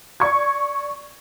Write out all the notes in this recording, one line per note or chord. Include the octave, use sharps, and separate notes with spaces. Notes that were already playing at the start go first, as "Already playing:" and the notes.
D5 C#6 G#6